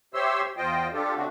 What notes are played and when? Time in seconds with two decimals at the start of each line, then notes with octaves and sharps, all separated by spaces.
0.14 G4 C5 C#5 E5 C6 E6
0.57 E2 F4 C5 D#5 G5
0.93 D4 F4 G4 A4
1.15 C#3 A3 C4 D4 F#4